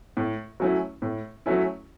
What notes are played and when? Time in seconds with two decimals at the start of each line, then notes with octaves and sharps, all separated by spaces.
0.17 A2
0.60 F#3 A3 C#4 E4
1.02 A2
1.46 F#3 A3 C#4 E4